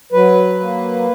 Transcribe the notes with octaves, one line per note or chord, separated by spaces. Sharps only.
F#3 B4
A#3